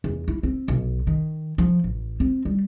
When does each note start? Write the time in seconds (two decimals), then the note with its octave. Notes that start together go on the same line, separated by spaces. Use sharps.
0.04 E2
0.28 E4
0.43 C4
0.68 B1
1.07 D#3
1.58 F3
1.84 A1
2.20 C4
2.45 G3